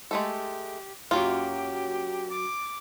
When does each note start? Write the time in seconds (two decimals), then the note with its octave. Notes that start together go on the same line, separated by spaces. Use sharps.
0.11 G#3 A3 G4 A4
1.11 F#2 F#3 A#3 F4 G4
2.30 D6